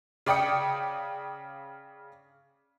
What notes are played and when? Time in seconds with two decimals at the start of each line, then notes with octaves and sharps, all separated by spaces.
0.26 C#3 D5 G5 D#6 C#7